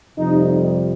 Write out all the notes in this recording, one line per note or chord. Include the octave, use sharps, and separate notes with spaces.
F2 C3 G3 D#4